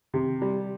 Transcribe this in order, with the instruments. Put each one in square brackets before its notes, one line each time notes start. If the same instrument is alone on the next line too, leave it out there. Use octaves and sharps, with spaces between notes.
[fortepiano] C3
G3